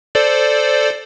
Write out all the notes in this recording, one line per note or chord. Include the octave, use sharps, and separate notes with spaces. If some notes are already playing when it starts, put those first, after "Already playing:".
A4 C5 D5